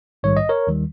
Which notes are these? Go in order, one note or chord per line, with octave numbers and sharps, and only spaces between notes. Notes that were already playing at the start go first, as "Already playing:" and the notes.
A#1 G#2 D#3 G3 C#5
D#5
A#4 C#5
D#2 D#3 G3